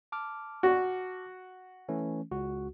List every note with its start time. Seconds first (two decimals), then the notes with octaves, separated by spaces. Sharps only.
0.12 A5 D6 F6
0.63 F#4
1.89 E3 A3 C#4
2.31 C#2 F#4